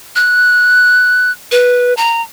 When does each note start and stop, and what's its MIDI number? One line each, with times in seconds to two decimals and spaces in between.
0.16 1.32 90
1.52 1.94 71
1.97 2.22 82